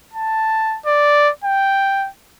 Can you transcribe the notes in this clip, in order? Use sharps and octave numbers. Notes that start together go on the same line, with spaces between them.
A5
D5
G5